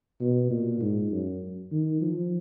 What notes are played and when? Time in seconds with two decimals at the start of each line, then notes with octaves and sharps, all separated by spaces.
0.21 B2
0.51 A#2
0.81 G#2
1.11 F#2
1.72 D#3
2.01 F3